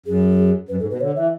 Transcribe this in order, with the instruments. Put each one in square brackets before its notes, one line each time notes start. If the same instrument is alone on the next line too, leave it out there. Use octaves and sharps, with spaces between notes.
[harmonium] F#2 [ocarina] G#4
[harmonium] F#2 [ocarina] B4
[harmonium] G#2 [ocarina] A4
[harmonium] B2 [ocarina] B4
[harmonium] D3 [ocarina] C#5
[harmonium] E3 [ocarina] E5